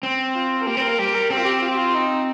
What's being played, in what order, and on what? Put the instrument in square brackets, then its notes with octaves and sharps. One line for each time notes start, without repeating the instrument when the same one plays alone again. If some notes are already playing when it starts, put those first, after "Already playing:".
[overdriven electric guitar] C4
[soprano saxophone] F4
A#4
[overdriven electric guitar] A#3 [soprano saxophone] G4
[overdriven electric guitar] C4 [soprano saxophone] C5
[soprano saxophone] A#4
[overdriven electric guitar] A#3
[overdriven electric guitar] G3 [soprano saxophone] G4
[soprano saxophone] A#4
[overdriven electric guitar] C4 [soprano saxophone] G4
[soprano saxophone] F4
G4
F4
G4
F4
D#4